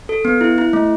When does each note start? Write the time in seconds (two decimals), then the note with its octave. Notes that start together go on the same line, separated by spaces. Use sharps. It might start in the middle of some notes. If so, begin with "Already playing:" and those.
0.09 A4
0.25 B3
0.41 E4
0.58 E4
0.73 A3